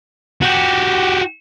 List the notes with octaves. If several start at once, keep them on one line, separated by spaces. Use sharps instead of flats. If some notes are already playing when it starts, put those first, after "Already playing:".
F#4 G4